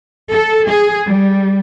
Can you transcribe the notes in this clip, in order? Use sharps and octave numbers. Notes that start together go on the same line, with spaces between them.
A4
G#4
G3